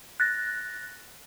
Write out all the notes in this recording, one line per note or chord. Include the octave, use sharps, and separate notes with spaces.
F#6 A6 A#6